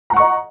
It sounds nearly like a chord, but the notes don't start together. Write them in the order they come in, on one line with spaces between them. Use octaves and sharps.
A#5 F#5 C#6 D#5